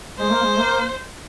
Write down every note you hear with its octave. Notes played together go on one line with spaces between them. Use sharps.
G#3 C5
A#3
G#3
A#3